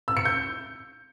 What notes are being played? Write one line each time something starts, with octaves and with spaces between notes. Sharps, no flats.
E6
C#7
G6